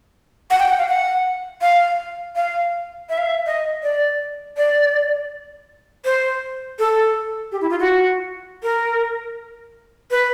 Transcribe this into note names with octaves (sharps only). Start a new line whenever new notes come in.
F#5
G5
F#5
F5
F#5
F5
F5
E5
F5
E5
D#5
D5
D5
C5
A4
G4
E4
F4
F#4
A#4
B4